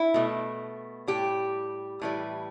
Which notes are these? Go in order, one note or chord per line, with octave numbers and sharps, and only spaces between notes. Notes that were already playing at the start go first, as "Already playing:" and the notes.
Already playing: E4
B2 A3
A2 G3 G4
A2 E3 G3